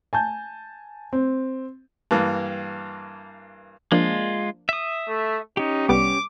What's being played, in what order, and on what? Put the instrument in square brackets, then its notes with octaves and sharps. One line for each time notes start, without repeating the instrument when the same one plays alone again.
[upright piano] G#5 A5 G6
C4
[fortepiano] G2 E3 A#3
[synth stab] F3 A#3 D4 [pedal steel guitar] G#3 F4
[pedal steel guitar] E5 D#6
[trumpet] A3
[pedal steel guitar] C#4 G4 [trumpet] D#4
[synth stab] C2 G3 B3 [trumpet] D6